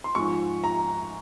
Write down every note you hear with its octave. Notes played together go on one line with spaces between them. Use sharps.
C6
G#2 F3 G#3 C#6
A#5